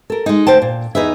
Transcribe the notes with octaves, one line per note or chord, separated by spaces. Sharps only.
A4 A#4
G#3 D#4
D2 C5 G5 A5
A#2
E2 D#4 G#4 B4 E5